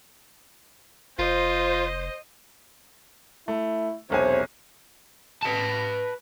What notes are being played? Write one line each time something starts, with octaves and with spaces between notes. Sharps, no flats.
F1 F4 C5 D#5
A3 E4
E1 B1 C3 C5 C#5 G#5
B4 A5